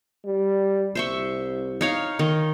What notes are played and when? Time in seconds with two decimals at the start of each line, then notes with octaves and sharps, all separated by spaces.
0.25 G3
0.95 C2 C5 E5 C#6
1.81 D#4 C#5 F5
2.19 D#3